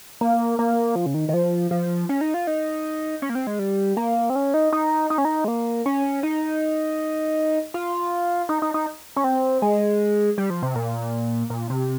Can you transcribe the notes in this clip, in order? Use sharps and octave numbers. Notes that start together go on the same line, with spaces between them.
A#3
A#3
F3
C#3
D#3
D#3
F3
F3
C#4
D#4
F4
D#4
C#4
A#3
C4
G#3
G3
A#3
C4
C#4
D#4
D#4
D#4
C#4
D#4
G#3
A#3
C#4
D#4
F4
D#4
D#4
D#4
C#4
C4
G#3
G3
F3
C3
A#2
A#2
C3